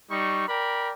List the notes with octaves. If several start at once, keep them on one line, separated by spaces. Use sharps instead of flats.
G3 D#4 C#6
A#4 D5 G5 B5